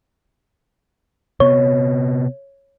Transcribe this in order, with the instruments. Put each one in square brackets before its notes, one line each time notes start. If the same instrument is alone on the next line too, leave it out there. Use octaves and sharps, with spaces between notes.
[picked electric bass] C3 B3 [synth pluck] C#5